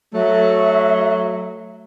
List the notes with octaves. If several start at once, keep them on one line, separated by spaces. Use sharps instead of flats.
F#3 A3 E5